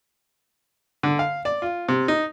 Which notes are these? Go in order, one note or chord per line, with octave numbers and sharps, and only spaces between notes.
D3
F5
D5
F4
C3
D#4